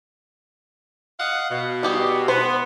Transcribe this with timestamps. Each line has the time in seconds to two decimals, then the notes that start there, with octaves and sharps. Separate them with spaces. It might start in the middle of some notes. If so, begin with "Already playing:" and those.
1.19 D#5 F5 F#5
1.50 B2
1.83 G3 G4 G#4
2.28 B3 C5